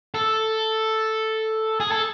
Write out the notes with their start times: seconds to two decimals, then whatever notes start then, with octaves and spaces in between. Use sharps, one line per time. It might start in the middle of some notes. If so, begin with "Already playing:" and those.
0.14 A4
1.80 G#4
1.91 A4